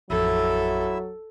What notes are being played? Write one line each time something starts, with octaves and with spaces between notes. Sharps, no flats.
A1 F2 F#3 E4 A4 E5 E6